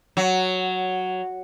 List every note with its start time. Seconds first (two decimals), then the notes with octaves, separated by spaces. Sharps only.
0.17 F#3